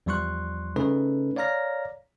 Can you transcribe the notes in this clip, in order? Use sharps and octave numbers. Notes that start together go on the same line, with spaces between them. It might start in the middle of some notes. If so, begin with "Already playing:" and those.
E2 F3 G3 C6 C#6 F#6
C#3 A3 C#4 D#4 A4 B4
C#5 D5 F5 A#5 F6 A#6